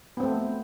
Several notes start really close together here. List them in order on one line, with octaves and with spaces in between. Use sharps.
B3 C4 A3